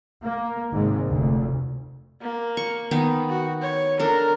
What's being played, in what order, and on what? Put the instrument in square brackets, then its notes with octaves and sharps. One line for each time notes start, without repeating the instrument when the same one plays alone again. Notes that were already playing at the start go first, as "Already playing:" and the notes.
[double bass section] A#3
G#1 G#2 C3
F1 D2
[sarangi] A#3
[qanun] C#6
D#3 B3 D#4
[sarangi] F#4
C#5
[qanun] D4 A4 [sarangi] A#4